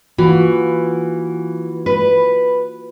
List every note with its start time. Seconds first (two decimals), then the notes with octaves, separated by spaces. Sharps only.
0.18 E3 A#3 F4 F#4
1.86 B4